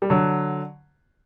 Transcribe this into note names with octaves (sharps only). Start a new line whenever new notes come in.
G3
D3 F#3